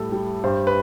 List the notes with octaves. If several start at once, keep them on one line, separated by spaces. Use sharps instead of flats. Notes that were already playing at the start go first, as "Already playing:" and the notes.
Already playing: A2 G3 A4
G3
G2 C5
B4